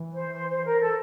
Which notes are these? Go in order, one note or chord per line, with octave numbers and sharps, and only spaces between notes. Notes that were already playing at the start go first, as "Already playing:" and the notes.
Already playing: E3
C5
C5
C5
A#4
A4